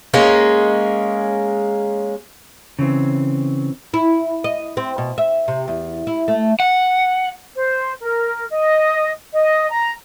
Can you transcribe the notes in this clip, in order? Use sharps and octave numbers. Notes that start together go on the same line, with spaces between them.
G#3 A#3 C#4
C#3 E3 C4
E4
D#5
C4
B2
E5
C3
E2
E4
A3
F#5
C5
A#4
D#5
D#5
A#5